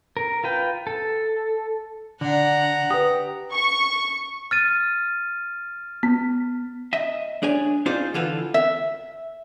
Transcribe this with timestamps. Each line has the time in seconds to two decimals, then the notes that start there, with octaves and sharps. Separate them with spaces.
0.17 A#4
0.44 F4 B4 G5
0.87 A4
2.21 D3 D4 F#5 A#5
2.90 G4 B4 D#6
3.53 C#6
4.51 F6 A6 D#7
6.03 B3
6.93 D#5 E5
7.43 D4 G#4 C#5 G#5
7.86 C4 D#4 F4 G#4 C5 D5
8.14 D3 E3 F4 A4 B4
8.54 E5